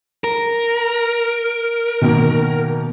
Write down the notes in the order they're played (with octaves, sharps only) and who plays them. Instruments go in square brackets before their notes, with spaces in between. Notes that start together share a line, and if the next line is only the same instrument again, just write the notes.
[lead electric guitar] A#4
[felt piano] B2 D#3 A#3